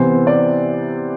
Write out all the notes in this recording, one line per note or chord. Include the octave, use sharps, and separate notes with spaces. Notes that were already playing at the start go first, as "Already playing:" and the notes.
Already playing: C3 E3 B3 C5
D5